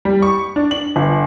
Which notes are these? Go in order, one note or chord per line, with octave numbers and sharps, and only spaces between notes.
G3
C#6
D4
F#7
G1